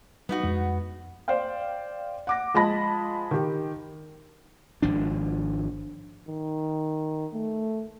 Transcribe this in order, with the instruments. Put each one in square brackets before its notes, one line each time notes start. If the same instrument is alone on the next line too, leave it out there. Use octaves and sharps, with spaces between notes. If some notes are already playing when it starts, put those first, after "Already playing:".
[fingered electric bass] G3 [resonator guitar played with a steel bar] B3 D#4 F#4
[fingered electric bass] F2 G#3
[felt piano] C5 D5 F5 G5
F#5 D6 A#6
F3 G#3 D#5 A5 B5 A#6
D#3 G4
[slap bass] G#1 F3 D4
[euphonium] D#3
A3